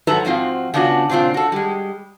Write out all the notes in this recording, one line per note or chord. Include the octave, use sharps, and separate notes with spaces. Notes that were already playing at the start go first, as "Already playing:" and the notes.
G#2 F#3 A4 B4 E5 A#5
G#2 F3 C4 F4 F#4
C#3 B3 D4 F4 F#4
A#2 C#3 C4 D4 F4
F#4 A4
G3 G#3